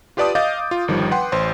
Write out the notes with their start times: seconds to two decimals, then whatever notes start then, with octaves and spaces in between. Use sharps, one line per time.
0.17 F4 G4 B4 D5 A5 D#6
0.35 D#5 F5 D6 G6 A6
0.71 F4
0.88 G1 D#3 F3 G3
1.11 B4 F#5 G5 C6
1.32 A1 C5 C6